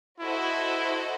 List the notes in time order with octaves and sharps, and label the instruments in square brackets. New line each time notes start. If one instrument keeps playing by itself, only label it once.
[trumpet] E4 [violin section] F#4 A4 C5 D#5